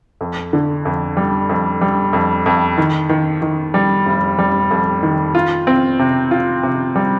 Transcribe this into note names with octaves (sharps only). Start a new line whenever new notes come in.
F2
D3
F2
G3
F2
G3
F2
F2
D#3
D#3
D#3
G3
F1
G3
F2
D#3
F4
C4
C3
F4
C3
G3